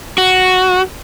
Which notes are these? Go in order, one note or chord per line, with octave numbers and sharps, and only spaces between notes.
F#4